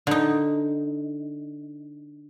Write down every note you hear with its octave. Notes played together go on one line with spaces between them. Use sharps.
D3 D#4